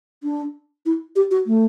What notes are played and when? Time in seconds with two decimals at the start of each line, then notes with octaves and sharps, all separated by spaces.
0.23 D4
0.86 E4
1.16 G4
1.31 F#4
1.47 A3